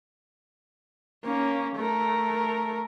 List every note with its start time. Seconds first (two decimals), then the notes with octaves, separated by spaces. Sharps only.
1.24 A#3 C#4
1.76 A3 A#4